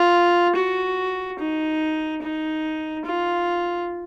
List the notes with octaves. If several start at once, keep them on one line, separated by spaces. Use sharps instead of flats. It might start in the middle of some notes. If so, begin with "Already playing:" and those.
Already playing: F4
F#4
D#4
D#4
F4